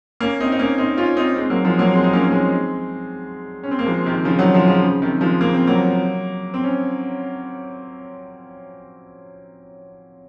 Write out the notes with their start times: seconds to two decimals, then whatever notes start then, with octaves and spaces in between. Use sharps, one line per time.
0.20 A#3 C#4
0.40 C4 D#4
0.52 D#4
0.59 A#3 C#4
0.78 C4 D#4
0.97 C#4 F4
1.17 C4 D#4
1.36 G#3 C4
1.50 F#3 A#3
1.65 F3 G#3
1.79 F#3 A#3
1.93 G#3 C4
2.04 D#4
2.13 A#3 C#4
2.28 A#3
2.32 G#3 C4
3.64 C#4
3.71 C4
3.79 A#3
3.86 F3 G#3
4.05 C3 D#3
4.25 C#3 F3
4.39 D#3 F#3
4.53 F3 G#3
4.68 C#3 F3
4.82 C#3
5.02 C3 D#3
5.21 F3 G#3
5.41 A#3
5.54 C4
5.67 F#3 A#3
6.54 C4
6.64 C#4